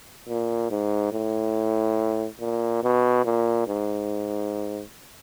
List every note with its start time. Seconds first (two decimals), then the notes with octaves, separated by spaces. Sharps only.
0.28 A#2
0.70 G#2
1.12 A2
2.40 A#2
2.83 B2
3.25 A#2
3.67 G#2